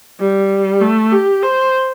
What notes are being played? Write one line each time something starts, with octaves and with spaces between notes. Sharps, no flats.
G3
A3
G4
C5